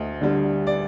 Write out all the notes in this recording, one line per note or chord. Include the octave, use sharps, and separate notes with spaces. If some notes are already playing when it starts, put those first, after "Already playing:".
Already playing: D2 D#5
D3 G3
D5